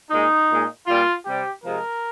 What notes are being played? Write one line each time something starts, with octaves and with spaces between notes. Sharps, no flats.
A#2 G#3 D#4
A#2 G#3
A#2 G3 F4
C3 G3 G4
C3 F3 G#3 A#4